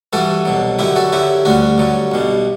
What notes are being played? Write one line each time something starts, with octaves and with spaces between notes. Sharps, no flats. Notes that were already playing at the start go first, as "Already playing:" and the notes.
G2 E3 G3 F#4 A4
C2 B2 F#3
F#2 D3 F#3 E4 G4
F#4 A4
F#2 D3 F#3 E4 G4
D2 D3 G3 D4 F#4
G2 D3 F#3
B1 B2 G3